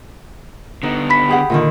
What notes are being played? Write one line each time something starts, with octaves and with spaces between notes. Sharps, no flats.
D3 B3 D#4
B5 B6
G4 G#4 F#5
A#2 D3 D#3